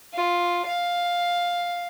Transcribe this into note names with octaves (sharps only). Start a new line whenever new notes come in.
F4
F5